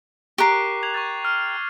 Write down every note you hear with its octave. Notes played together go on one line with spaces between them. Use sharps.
G4 A#4 C#6 F#6 C7
D6
G#6 F7 F#7
C#6 F#6 A6
F6